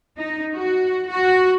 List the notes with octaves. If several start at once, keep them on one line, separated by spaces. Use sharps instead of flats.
D#4
F#4
F#4